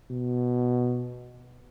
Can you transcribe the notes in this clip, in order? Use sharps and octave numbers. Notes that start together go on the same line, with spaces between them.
B2